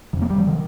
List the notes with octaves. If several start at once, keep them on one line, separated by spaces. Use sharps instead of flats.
F2 C3 D#3
A#3
G3
F3
C3 D#3